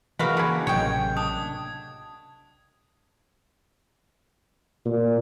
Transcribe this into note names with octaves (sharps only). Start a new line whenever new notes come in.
C#3 E3 A#3 F#4 B4 F5 B5
D3 G#4
A1 C3 F#3 C#5 D#5 G5 G#6
D4 D#6
A#2